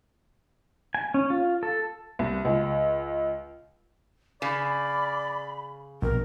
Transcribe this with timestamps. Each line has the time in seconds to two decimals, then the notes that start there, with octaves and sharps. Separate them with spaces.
0.95 G#5
1.14 C#4
1.30 F4
1.63 A4
2.19 C2
2.45 C#2
4.42 C#3 D5 B5
6.02 A#1 B2 A#4